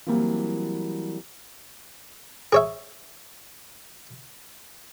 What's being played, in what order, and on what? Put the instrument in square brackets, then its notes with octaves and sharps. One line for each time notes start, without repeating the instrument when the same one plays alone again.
[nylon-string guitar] E3 F#3 G3 A#3 C4 F4
[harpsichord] G#4 C#5 E5